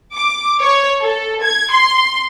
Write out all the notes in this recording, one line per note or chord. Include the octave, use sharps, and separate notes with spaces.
D6
C#5
A4
G#6
C6